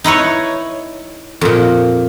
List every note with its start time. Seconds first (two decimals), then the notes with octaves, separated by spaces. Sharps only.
0.04 D#4 E4 B4 C#5
1.41 F2 A#2